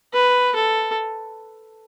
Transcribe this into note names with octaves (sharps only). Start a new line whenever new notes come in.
B4
A4